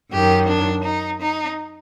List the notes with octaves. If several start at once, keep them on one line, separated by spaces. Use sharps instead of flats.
F#2 D#3 G4
D4
D#4
D#4